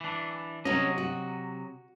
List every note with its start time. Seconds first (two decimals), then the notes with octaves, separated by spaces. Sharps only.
0.01 E3 D4
0.65 C3 F#3 C#4 F#4 D#5
0.98 F#4